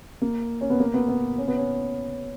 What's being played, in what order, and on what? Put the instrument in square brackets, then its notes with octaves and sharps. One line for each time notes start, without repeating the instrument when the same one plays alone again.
[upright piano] A#3
C#4
B3
A#3
B3
B3
C#4
B3
C#4